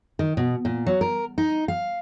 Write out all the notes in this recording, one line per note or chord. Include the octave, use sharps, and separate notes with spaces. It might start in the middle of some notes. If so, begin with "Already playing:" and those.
D#3
B2
A#2
F#3
A#4
D#4
F5